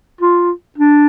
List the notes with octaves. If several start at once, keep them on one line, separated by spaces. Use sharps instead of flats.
F4
D4